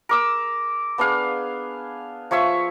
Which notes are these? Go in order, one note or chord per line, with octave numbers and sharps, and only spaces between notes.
A#4 D6 E6
B3 D4 G#4 F5
F3 C#5 E5 C#6